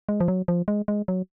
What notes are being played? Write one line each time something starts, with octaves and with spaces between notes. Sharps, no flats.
G#3
F3
F#3
F3
G#3
G#3
F#3